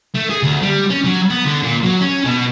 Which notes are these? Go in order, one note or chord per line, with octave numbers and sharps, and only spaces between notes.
A3
G#4
D2
G3
C#4
F#3
B3
D3
A#2
F#3
C#4
B2